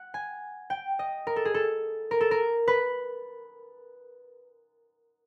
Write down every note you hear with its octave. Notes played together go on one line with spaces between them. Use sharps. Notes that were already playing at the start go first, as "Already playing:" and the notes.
Already playing: F#5
G#5
G5
D#5
A#4
A4
G#4
A4
A#4
A4
A#4
B4